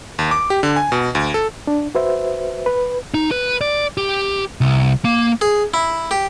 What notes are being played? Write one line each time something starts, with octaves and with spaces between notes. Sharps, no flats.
D#2
D6
G4
D3
G#5
B2
D2
A4
D4
F#4 B4 C5 E5
B4
D#4
B4
D5
G4
C2
A#3
G#4
E4
G4